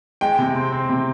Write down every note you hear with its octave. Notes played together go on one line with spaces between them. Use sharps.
G#3 G5
C3
C4
C4
C3